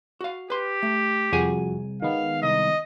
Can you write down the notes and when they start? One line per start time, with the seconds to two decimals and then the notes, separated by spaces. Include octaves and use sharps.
0.21 F#4 F5
0.50 G4 B4 C6
0.83 A3
1.33 C2 F2 F#4 G#4 G#5
2.02 D#3 G#3 B3 F5
2.42 C2 D#5